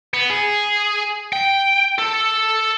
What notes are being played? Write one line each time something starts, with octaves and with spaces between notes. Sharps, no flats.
B3
G#4
G5
A4